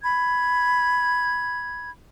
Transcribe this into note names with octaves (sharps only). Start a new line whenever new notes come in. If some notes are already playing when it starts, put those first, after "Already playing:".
B5 G#6